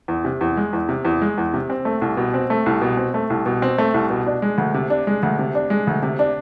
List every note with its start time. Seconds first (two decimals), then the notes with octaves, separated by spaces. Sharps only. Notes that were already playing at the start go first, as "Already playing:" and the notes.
0.08 E2
0.25 C3
0.41 E2
0.57 G#3
0.73 E2
0.89 C3
1.05 E2
1.22 G#3
1.38 E2
1.54 C3
1.70 C4
1.85 A3
2.01 C2
2.17 B2
2.34 C4
2.50 A3
2.66 C2
2.81 B2
2.97 C4
3.14 A3
3.30 C2
3.46 B2
3.62 C4
3.78 A3
3.94 C2
4.10 B2
4.27 D4
4.42 G#3
4.58 D2
4.74 C3
4.90 D4
5.07 G#3
5.23 D2
5.39 C3
5.55 D4
5.70 G#3
5.87 D2
6.03 C3
6.19 D4